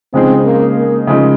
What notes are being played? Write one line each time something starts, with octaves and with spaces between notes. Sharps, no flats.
C#3 F3 G#3 C4 D#4 G#4
A#3
A#3
C#3 F3 G#3 D#4 G#4